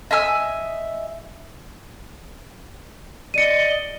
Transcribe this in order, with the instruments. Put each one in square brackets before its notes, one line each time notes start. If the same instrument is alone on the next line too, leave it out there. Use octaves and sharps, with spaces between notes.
[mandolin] D#5 E5 G#5 E6
[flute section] D5 D#5 [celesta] C#7 D#7